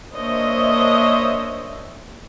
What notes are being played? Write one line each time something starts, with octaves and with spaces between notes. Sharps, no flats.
A#3 D4 C5 C#5 D#5 E5